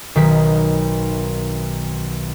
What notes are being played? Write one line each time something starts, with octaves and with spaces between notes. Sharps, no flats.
B1 D#3 B6